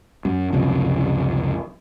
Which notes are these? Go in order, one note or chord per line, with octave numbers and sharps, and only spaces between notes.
F#2
C#2 F#2 C3 F3